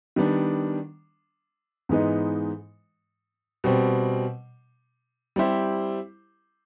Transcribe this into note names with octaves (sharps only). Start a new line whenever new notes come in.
D#3 G3 B3 D4
G#2 E3 G#3 B3 D#4
B2 G3 C4
G3 C4 E4 G4 C5